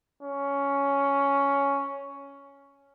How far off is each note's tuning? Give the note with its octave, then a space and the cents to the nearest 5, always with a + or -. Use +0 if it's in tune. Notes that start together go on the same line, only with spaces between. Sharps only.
C#4 +10